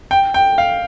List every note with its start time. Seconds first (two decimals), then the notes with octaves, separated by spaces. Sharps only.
0.11 G5
0.34 G5
0.58 F5